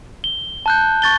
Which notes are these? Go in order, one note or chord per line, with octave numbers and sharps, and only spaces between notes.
G7
A5 F#6 G6
C#6 A6 G7